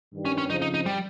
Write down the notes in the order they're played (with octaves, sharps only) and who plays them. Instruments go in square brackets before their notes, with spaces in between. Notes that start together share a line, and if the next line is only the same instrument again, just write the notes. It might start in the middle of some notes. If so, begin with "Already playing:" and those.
[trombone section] G2 D#3 G3
[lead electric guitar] C#4
C#4
[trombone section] F2 C#3 F3 [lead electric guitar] D#4
[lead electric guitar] D#4
D#4
G3